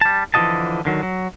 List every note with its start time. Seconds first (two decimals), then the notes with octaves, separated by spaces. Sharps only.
0.01 G3 A5
0.34 D3 E3 F3 F#4 D#5 A5
0.85 D3 D#3 F#3
1.03 F#3